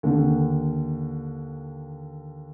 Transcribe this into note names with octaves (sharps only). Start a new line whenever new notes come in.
D#2 D3